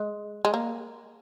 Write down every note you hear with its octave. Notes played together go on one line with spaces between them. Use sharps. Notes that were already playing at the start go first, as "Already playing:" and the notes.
Already playing: G#3
G#3
A#3